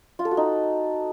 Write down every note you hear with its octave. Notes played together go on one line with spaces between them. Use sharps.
F4
A4
F#4
D#4